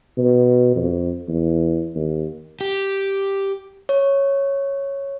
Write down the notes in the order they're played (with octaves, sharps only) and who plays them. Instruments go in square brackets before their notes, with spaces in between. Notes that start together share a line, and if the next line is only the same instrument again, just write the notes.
[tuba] B2
F2
E2
D#2
[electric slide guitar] G4
[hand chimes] C#5